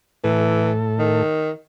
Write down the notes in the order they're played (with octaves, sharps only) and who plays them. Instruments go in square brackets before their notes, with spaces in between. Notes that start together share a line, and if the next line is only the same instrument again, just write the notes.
[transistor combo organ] A2 A4 [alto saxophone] E3
[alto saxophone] D#3